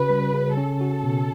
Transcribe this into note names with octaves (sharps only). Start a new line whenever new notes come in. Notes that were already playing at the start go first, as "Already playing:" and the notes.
Already playing: C#3 C#4 F#4 B4
G3
C#3
C#4 A4
F#4
B2